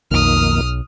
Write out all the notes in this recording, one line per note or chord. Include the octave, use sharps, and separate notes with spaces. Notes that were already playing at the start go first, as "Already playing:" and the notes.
B1 F2 D#3 A#3 D#6 F6